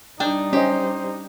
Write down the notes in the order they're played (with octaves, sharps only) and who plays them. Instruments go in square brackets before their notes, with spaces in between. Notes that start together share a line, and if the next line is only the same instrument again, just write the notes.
[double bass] G3 D#4 [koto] D4 [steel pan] G5
[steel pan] C#4 D#5 [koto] G4 [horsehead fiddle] C5